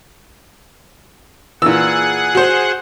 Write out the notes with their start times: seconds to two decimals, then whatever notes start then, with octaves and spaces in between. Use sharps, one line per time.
1.62 A#2 E3 G#4 F#5 E6
2.35 F#4 C5